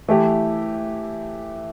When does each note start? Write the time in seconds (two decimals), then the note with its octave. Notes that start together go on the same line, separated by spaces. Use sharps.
0.08 E3 A3 E4 G4